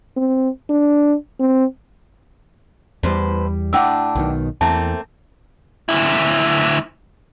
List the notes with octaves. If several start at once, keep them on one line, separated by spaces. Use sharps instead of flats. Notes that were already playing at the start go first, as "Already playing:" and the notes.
C4
D4
C4
E2 A2 G3 B4 C5
A2 D4 F#5 G5 E6
B1 B2 D#3
E2 A3 A#3 C4 A5
D2 E4